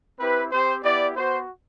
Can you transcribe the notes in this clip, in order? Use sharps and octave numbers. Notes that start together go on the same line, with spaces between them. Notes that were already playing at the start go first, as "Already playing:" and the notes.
C4 E4 G4 B4
C4 G4 C5
B3 E4 G4 D5
B3 F#4 C5